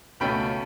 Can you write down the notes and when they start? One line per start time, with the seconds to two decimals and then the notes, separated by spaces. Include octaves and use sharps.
0.20 C#2 B2 A3 C#4 G5 B5